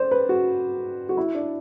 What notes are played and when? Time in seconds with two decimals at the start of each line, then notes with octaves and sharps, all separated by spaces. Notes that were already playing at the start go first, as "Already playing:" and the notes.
Already playing: C5 D5
0.11 B4
0.29 F#4
1.09 F#4
1.17 E4
1.35 D4